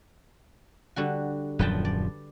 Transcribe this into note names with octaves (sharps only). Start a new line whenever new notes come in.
D3 G3 F#4
D#1 F#2 F3 B4 G5 A5
D5